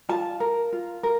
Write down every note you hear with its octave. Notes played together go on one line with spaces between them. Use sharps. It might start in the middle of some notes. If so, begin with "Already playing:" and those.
F4 A5
A#4
F4
A#4